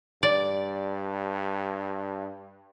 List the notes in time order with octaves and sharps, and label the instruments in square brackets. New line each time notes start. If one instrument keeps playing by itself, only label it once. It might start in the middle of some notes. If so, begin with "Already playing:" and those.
[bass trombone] G2 [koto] D5